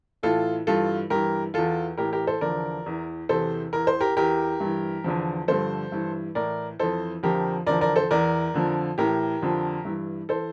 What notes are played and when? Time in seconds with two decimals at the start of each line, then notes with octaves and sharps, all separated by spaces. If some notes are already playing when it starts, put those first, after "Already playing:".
0.23 A2 E3 F4 A4
0.67 G2 E3 F4 A4
1.10 G2 E3 G4 A#4
1.54 E2 E3 F4 A4
1.98 A2 E3 G4 A#4
2.13 G4 A#4
2.27 A4 C5
2.41 E2 D3 F3 A#4 D5
2.86 E2 E3
3.29 E2 C3 E3 A4 C5
3.73 E2 E3 A#4
3.87 C5
4.01 G4 A#4
4.17 E2 E3 G4 A#4
4.60 G2 E3
5.04 E2 D3 F3
5.48 G2 D3 F3 A4 C5
5.92 G2 E3
6.35 A2 E3 A#4 D5
6.79 F2 E3 A4 C5
7.23 F2 D3 F3 G4 A#4
7.66 E2 D3 F3 A#4 D5
7.81 A#4 D5
7.96 A4 C5
8.11 E2 E3 A#4 D5
8.54 F2 D3 F3
8.98 A2 E3 G4 A#4
9.42 F2 D3 F3
9.85 G2 E3
10.29 E3 A4 C5